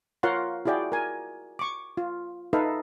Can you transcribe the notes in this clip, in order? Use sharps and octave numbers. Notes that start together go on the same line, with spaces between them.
F4 A#4 C#5 F5 F#5 C6
E4 F#4 G#4 D5 G5
A#4 G#5
C#6 D6
F4
D#4 A4 B4 E5 F5